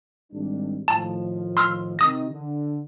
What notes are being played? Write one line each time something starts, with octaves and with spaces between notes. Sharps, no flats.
G#1 G3 D4
A2 D#3 F3 A5
C6 E6 F6
C3 D#3 D#4 D#6 A#6
D3